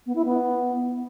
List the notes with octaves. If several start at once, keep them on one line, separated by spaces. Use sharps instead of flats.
B3
E4
B3